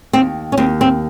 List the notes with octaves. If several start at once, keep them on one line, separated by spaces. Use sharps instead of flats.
D#2 C4
C#4
D#2 C4
C4